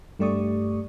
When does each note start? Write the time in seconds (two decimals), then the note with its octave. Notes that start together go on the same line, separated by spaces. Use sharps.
0.19 G2 A3 G4 D5 C#6 D#6